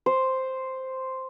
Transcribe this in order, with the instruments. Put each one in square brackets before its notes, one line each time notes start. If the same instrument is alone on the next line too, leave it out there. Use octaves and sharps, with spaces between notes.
[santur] C5